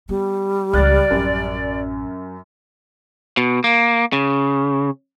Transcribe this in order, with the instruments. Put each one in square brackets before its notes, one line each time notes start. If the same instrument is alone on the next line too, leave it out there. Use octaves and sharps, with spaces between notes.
[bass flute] G3 [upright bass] B3
[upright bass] C#2 E3 [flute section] D5 [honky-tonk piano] F6 F#6 A6
[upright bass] A1 [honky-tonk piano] F#2
[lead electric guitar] B2
A#3
C#3